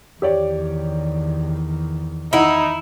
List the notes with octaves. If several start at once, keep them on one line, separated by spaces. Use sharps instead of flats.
E2 D#3 G4 C#5 D5
D#4 E4 D#5 F#5